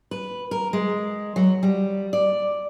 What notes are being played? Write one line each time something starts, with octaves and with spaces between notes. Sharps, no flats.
B4
A#4
G#3
F#3
G3
D5